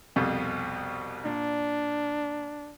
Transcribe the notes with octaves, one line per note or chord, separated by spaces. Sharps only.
C2 F2 B2
A#2 D4